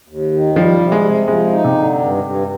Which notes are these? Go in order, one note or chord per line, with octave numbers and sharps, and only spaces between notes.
D#2
D#3
F3 G3
C3
G#3
C3
F3 G#3
D#4
C3
D3
G2
G2